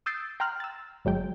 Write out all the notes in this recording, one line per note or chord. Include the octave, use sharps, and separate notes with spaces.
D#6 E6 G6 A6 C7 D7
G5 A#5 C6 F6 F#6
E6 A6
G1 F#3 G#3 G5